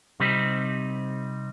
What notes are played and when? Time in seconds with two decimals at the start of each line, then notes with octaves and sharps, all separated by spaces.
0.20 C3 G3 C4 D#4